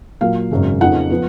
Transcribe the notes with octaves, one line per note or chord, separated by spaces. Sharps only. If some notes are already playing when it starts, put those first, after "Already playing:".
A#2 F#3 A#3 F4 F5
G#1 F#2 C#3
F2 C#3 F3 A#3 D#4 F#5
F3 B3